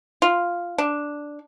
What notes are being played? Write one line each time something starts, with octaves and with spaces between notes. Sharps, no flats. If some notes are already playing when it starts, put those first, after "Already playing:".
F4
D4